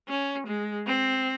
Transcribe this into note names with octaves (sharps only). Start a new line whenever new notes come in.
C#4
G#3
C4